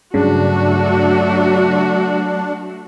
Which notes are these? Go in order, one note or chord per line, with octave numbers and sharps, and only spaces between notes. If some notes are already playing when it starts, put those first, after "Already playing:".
G2 C#3 F#3 A3 D4 F#4